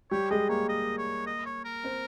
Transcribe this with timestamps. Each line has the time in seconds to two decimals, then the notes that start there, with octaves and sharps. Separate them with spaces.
0.11 G3 G4 C#5
0.31 G#3 G#4 D#5
0.49 A#3 A#4 C#5
0.69 D#5
0.98 C#5
1.27 D#5
1.46 C#5
1.65 A#4
1.83 C4 C5